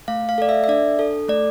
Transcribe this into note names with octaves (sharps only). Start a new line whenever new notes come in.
A3 F5
F5
A4 D5
E5
E5
D4 D5
A4
A3 D5